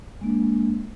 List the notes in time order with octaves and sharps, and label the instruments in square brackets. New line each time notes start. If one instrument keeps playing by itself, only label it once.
[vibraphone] G#3 A#3 D4